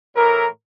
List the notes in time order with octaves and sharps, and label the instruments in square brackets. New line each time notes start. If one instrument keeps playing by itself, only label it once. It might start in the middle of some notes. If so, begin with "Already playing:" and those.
[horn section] A2 E3 A#4